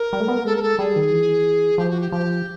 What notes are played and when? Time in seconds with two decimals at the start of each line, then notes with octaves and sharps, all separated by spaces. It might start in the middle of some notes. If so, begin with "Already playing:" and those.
Already playing: A#4
0.13 G3
0.20 A3
0.28 B3
0.38 A#3
0.45 G#3 A4
0.56 A#4
0.62 A4
0.78 G3 G#4
0.96 D#3
1.12 E3
1.78 F3 G4
1.90 F#4
2.00 G4
2.12 F3 G4